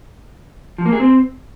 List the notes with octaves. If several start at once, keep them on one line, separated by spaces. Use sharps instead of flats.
F3
A#3
G#4
C4